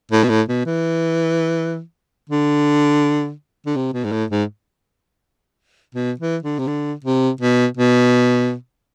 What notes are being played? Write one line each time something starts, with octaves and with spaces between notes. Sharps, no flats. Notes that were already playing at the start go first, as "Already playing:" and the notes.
A2
B2
A2
B2
E3
D3
D3
C3
B2
G#2
A2
G#2
B2
E3
D3
C3
D3
C3
B2
B2